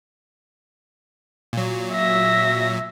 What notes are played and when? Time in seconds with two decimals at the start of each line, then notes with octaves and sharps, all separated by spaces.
1.53 A#2 F#3
1.93 E5 A#6